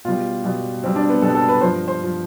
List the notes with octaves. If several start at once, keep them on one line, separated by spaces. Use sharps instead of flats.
B2 G3 F4
B2 G3
B2 G3 C4
D4
B3
B2 G3 A4
A4
B4
G2 F3 C5
C5
F3